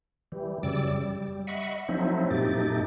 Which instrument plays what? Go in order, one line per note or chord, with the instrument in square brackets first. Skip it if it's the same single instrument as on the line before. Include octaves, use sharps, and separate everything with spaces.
[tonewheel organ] E3 G3
F#2 C#3 G3 D5 D6 E6
G3
D#5 E5 F#5 B5 C#6
F3 F#3 A3 C4 D#4 E4
F#2 A#2 A3 D#4 G4 A6